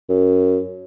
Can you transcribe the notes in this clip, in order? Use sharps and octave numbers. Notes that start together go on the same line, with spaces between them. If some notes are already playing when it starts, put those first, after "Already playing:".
F#2